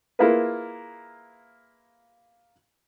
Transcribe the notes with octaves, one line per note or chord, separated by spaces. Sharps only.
A#3 E4 F4 G#4 A#4 B4